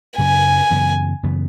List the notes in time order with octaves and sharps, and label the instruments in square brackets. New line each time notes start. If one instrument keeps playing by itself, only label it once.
[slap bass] F#2 C#3 F#3 [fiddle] G#5
[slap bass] F#2 C#3 E3 B3
F#2 C#3 E3 B3